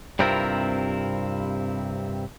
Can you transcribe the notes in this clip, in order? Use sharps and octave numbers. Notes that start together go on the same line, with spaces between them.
G2 C3 C4 E4 F4 A#4